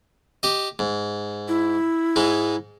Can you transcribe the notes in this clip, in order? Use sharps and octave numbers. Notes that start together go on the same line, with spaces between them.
G4 D#5
G#2
E4
G#2 G#3 D#4